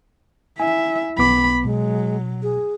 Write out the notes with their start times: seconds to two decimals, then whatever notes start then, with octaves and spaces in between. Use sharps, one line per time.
0.60 E4 E5 G#5
1.18 B1 B3 B5 D6
1.64 B2 F#3 G#3
2.43 G#4